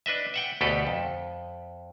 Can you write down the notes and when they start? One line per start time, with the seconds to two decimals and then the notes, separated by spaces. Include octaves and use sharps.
0.06 D4 B4 D#5 E5
0.34 E5 F#5 G5
0.61 D2 B2 G4 A4 B4
0.87 F2